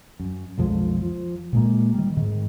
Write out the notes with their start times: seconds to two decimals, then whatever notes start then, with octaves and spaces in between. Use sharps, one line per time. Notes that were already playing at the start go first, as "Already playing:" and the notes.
0.20 F#2
0.58 B1 F2 F3 G#3
1.02 F3
1.53 A#2 G#3 A#3
1.94 D#3 G3
2.17 G#2 D#3